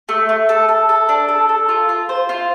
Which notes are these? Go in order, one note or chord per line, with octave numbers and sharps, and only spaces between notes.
A3
A3
A4
A4
A4
D4
A4
A4
F4
F4
C5
F4